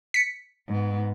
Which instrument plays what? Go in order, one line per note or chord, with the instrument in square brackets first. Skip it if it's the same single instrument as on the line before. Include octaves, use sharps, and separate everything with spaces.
[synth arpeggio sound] B6 C#7
[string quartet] G#2 B3